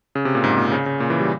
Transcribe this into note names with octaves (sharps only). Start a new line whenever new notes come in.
C#3
C3
A#2
G#2
A#2
C#3
C#3
A#2
E3
G3